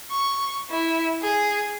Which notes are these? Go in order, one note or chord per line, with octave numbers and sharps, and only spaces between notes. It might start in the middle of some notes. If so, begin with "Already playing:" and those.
C#6
E4
G#4